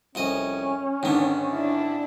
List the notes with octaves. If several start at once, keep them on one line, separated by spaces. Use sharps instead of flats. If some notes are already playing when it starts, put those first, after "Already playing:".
C2 F2 C#4 D#5
G#2 D3 D#3 B3
D4 E4